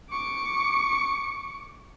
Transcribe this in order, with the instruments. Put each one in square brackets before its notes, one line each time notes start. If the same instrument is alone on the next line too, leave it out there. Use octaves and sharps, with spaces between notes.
[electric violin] C#6 D6